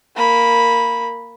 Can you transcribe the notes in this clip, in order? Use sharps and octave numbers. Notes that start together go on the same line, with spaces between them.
A#3 B5